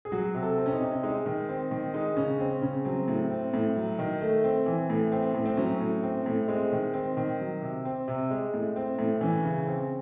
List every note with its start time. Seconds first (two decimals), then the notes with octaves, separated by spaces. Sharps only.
0.05 G#4
0.12 F#3 F#4
0.34 C3
0.43 A4
0.58 C4
0.66 C#4
0.73 D#4
0.81 C3
0.92 C#4
1.03 G#3 D#4
1.26 D#3
1.49 C4
1.71 D#3
1.94 G#3 D#4
2.17 C#3 C#4
2.39 C4 C#4
2.62 C#3 C#4
2.85 F#3 C4
3.08 A2
3.30 C4
3.54 A2
3.76 F#3
3.99 D#3
4.21 A3
4.44 C4
4.66 E3
4.90 A2
5.12 C4
5.35 A2
5.45 C4
5.57 F#3 C#4
5.80 A2
6.03 C4
6.26 A2
6.48 G#3 C4
6.72 D#3
6.93 C4
7.17 D#3
7.40 F#3
7.62 C3
7.85 C4
8.08 C3
8.30 G#3
8.54 A2
8.76 C4
8.99 A2
9.21 E3 C#4
9.44 C#3
9.67 C4